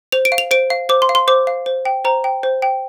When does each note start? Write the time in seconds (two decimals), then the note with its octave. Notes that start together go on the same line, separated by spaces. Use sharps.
0.12 C5 F7
0.25 D7
0.32 F5
0.38 F7
0.51 C5 D7
0.70 F5
0.89 C5 D6
1.02 C6
1.09 F5
1.15 C6
1.28 C5 D6
1.47 F5
1.66 C5
1.85 G5
2.05 C5 A#5
2.24 G5
2.43 C5
2.62 G5